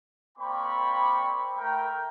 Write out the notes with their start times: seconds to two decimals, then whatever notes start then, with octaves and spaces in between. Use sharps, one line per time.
0.38 A#3 C4 D5 G5 B5 C#6
1.57 A3 A#4 G5